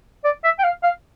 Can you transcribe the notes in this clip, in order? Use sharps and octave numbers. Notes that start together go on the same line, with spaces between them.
D5
E5
G5
F5
F5